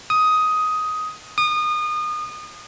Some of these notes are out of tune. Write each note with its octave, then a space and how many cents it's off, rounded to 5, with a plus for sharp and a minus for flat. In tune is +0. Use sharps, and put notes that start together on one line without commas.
D#6 +10
D#6 -30